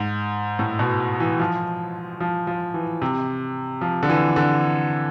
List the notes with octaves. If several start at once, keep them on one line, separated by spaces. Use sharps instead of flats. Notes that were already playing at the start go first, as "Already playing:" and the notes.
Already playing: G#2
A2
B2
E3
F3
F3
F3
E3
C3
F3
D3
E3
D3